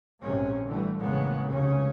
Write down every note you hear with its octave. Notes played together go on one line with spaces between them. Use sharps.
A#1 G#2 C3 C#4
D3 E3 G3 A3
A1 F2 C#3 G#3 A#3 B3
F1 C#2 C#3 C#4